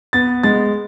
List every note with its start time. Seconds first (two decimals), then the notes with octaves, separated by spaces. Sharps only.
0.13 B3 A6
0.43 G#3 A6